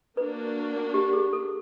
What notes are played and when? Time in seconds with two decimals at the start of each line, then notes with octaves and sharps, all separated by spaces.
0.17 A#3 D4 F#4 B4
0.94 G4
1.13 G#4
1.33 A4